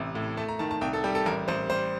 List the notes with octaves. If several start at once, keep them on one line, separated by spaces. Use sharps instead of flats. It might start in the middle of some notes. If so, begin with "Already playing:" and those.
Already playing: A1 C3
A2
A3 A5
A#5
D#3 A5
A5
C2 G5
A4
G3 G4
A4
A1 A#4
A1 C5
G3 C5